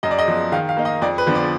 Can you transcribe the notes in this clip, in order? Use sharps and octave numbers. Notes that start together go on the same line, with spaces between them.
F#2 D#5
D5
D#5
F3 B3
D#3 F5
F5
A#3 D#4
D#5
F2 D5
B4
D3 F3 B3 D4
D5